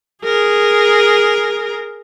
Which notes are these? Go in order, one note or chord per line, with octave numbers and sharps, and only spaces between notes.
G#4 A#4